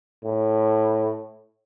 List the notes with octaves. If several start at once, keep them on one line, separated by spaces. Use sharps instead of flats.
A2